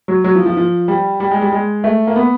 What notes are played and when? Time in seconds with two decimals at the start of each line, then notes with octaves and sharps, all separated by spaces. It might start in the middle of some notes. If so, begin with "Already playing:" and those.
0.08 F#3
0.24 F#3
0.36 F3
0.46 F3
0.57 F3
0.88 G3
1.20 G3
1.31 G#3
1.42 G3
1.52 G#3
1.84 A3
2.07 A#3
2.16 B3